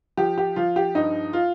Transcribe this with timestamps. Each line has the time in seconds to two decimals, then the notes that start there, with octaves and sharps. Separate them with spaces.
0.17 F3 G4
0.38 G4
0.56 F3 F4
0.76 G4
0.95 G2 D#4
1.33 F4